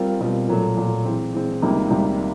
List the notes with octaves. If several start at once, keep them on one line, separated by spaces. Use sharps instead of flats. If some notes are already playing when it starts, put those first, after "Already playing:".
Already playing: G3 C4 F4 A#4
B2 G3 C4 F4 A#4
A#2 F#3 A3
A#2 F#3 A3
E3 G#3 C4
E3 G#3 C4
C#2 C3 D#3 G3 A#3
C#2 C3 D#3 G3 A#3